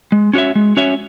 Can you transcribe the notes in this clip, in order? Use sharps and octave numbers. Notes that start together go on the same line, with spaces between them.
G#3
C#4 F#4 C#5 E5
G#3
C#4 F#4 C#5 E5